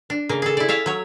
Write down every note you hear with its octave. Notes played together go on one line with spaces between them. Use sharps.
D4
C#3 A#3
G#4 A4
E4 D5
C#5 E5 F5 A5
F#3 C#5